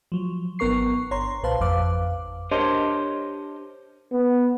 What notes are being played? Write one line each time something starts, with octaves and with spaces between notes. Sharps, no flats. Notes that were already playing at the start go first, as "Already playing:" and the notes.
F3 F#3
G#1 B3 A#4 C#6 C7
G1 C#5 A#5 C6
B1 A#2 B4 C5 F5 A5
G#1 F2 B4 F5 D6
D4 G4 A#4 C5 C#5 D#5
B3